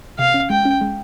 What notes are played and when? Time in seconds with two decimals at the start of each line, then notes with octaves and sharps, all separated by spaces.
0.19 C3 F5
0.34 C#4
0.50 G#3 G5
0.65 C#4
0.81 G#3